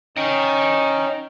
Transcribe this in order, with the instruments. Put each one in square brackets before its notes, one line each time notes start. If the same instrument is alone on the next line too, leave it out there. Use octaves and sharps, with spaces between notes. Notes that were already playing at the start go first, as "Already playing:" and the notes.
[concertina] C#4 D#4 [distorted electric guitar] D#5 G5